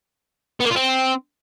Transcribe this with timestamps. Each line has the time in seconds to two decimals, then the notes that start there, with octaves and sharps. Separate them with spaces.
0.60 B3
0.65 A#3
0.70 F4
0.76 C4